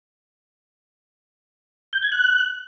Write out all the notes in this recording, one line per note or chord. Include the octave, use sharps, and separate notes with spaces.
G6
G#6
F#6